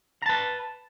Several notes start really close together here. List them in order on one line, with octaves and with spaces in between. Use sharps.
A#5 A5 B4